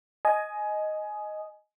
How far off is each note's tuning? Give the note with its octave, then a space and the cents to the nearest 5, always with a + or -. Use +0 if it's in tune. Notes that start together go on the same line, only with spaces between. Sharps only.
D#5 +0 G#5 +20